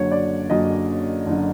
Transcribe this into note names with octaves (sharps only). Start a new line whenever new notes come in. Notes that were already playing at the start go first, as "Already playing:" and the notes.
Already playing: F#1 F#2 D3 C#5
D5
F#1 F#2 D3 D#5
F#1 D3